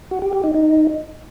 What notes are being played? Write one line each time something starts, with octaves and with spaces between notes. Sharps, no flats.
F#4
G4
G4
D#4
D#4